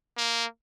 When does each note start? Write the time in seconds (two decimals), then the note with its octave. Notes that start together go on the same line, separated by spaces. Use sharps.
0.18 A#3